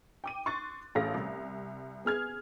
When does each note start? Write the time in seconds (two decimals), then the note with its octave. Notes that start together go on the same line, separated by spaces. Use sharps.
0.24 G5 D6 D#7
0.46 C6 C#6 F#6 A6
0.95 A1 A4 F5 A#6
1.14 C2
2.05 B3 G#4 F6 G#6